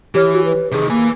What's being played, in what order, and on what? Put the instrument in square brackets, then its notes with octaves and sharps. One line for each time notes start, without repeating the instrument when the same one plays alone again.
[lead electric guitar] E3 [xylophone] G4 C#5 F6
[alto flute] F#4
B4
[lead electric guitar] C3 D#3 [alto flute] G#4
[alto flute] A#3 [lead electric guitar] B4 G#5